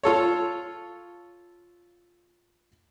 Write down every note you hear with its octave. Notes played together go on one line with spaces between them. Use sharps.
F4 A4 C#5